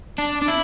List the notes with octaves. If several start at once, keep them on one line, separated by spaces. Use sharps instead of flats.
D4
D4
E4